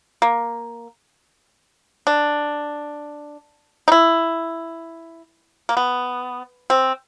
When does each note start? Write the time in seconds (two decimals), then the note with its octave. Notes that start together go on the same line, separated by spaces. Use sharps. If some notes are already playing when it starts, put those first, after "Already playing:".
0.22 A#3
2.07 D4
3.88 D#4
3.92 E4
5.69 A#3
5.77 B3
6.70 C4